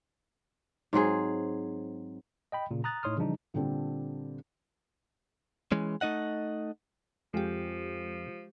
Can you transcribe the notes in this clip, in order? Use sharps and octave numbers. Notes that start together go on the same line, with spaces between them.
G#2 F#3 C4 G#4
D#5 G5 B5
A#2 C#3
A#5 D#6 F#6 A6
A2 D#4 C#5 C6 D#6 F6
C#3 E3 F3 G3 D4 D#4
A#2 D3 G3 C4 D4
E3 G#3 C#4
A3 D#4 D#5 F#5
F2 F3 G#3 G4 F5 G5